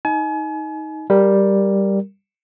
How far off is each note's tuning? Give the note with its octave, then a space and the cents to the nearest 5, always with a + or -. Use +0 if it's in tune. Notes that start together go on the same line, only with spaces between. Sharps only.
D#4 +15 G#5 +40
G3 +0 A#4 +0